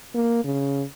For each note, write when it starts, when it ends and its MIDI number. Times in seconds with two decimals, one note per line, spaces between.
0.15 0.44 58
0.44 0.84 49